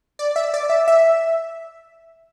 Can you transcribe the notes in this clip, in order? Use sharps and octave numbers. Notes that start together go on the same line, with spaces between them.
D5
E5
D5
E5
E5